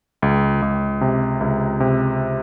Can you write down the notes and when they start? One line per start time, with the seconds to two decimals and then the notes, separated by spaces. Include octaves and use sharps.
0.22 C#2
0.62 C#2
1.01 C3
1.41 C#2
1.80 C3